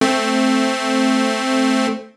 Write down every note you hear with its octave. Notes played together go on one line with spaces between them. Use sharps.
A3 C4